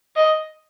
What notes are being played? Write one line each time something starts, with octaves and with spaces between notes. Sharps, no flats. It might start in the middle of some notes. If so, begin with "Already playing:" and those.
D#5